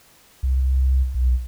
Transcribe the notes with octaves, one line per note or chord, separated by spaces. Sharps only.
C2
B1